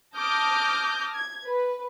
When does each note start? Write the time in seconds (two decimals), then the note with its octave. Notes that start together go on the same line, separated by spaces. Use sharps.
0.17 A5 D6 D#6 F6 G6 A#6
1.15 G#6
1.46 B4